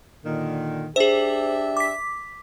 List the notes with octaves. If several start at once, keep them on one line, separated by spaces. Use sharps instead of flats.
A#2 D3 D#3
D4 G4 G#4 C5 E5
D6 B6